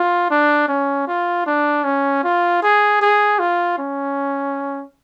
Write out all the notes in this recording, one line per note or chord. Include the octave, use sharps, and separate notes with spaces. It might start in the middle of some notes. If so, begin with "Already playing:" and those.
Already playing: F4
D4
C#4
F4
D4
C#4
F4
G#4
G#4
F4
C#4